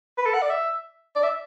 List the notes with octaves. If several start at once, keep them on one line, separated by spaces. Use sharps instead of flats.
B4
A4
F#5
D5
E5
D5
E5